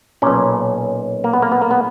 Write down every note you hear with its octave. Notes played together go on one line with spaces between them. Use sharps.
B1 A#2 C#4
A#3
B3
A#3
B3
A#3
B3